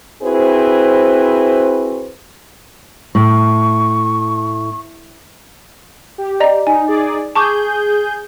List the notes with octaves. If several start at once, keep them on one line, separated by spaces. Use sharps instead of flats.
C4 E4 F#4 G#4 B4 C5
A2 C#6
G4
D5 D#5 A#5
D#4 G#5
D#4 G#4 D5
G#4 A5 C#6 D6 G6